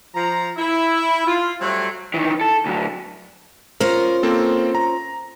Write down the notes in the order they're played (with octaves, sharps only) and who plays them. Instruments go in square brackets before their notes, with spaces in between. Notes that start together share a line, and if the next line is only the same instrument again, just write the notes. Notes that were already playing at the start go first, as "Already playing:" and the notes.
[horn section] F3 A#5
E4
F4
F#3 G3 A3 C4
[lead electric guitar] D#3 E3
A4
D2 F#3
[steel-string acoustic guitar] C#4 F4 C5 [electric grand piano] A#4
[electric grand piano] A#3 C4 A4
A#5